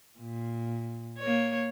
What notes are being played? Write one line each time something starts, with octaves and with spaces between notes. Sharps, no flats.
A#2
A#3 C#5